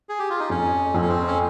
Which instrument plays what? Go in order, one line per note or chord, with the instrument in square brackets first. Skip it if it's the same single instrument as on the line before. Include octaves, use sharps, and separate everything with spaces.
[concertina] G#4
G4
F4
D#4
[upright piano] F2 [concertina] C#4
[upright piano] F2 [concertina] C4
[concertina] C#4
C4
C#4